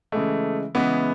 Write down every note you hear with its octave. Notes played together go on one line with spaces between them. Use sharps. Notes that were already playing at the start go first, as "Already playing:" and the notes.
C#3 E3 G#3 A3
C#3 E3 G#3 B3